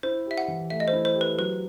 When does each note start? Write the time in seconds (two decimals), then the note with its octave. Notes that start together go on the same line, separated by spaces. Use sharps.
0.03 E4 C5
0.26 G4 E5
0.38 F#5
0.48 E3
0.70 A3 E5
0.80 D#5
0.88 C5
0.93 E4
1.05 C5
1.16 G4
1.21 B4
1.38 F#3 B4